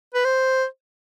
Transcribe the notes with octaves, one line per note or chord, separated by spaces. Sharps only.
B4
C5